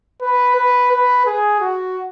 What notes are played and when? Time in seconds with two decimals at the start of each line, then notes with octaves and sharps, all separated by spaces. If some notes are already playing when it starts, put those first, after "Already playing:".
0.21 B4
0.56 B4
0.92 B4
1.26 G#4
1.61 F#4